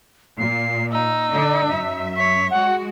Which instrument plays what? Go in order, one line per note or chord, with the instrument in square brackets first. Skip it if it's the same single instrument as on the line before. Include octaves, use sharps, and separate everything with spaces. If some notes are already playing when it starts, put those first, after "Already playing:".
[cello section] A#2 [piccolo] C7
[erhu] D#4 [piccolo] E6
[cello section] D3 D4
F#2 E5
[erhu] C#5 [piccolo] B6
[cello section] G#3 F#4 [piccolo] F#5